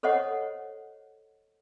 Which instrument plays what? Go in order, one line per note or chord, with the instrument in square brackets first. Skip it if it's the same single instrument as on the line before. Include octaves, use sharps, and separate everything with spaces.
[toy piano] A4 C5 C#5 D#5 F#5